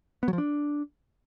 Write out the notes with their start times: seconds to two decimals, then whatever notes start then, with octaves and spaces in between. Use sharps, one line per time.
0.23 B3
0.28 F#3
0.33 F3
0.38 D4